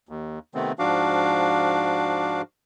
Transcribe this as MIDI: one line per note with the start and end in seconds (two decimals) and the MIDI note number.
0.09 0.39 39
0.55 0.72 48
0.55 0.72 51
0.55 0.72 57
0.55 0.72 59
0.55 0.72 60
0.79 2.42 44
0.79 2.42 53
0.79 2.42 62
0.79 2.42 66
0.79 2.42 77
0.79 2.42 86